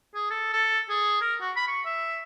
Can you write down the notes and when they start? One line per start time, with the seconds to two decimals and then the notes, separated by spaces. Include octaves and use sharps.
0.14 G#4
0.30 A4
0.53 A4
0.89 G#4
1.21 A#4
1.41 F#4
1.56 B5
1.67 C#6
1.86 E5